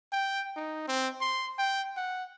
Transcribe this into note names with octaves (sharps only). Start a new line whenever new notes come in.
G5
D#4
C4
C6
G5
F#5